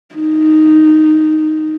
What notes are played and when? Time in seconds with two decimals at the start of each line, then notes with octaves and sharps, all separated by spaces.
0.15 D#4